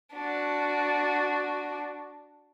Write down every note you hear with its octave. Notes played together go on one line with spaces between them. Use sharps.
D4 F#4